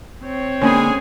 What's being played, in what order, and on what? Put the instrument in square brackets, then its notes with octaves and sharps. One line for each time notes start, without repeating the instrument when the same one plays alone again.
[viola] C4 C#5
[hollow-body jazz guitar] D3 A#3 B5 [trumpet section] G#3 G#4 G#5 [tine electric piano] C#4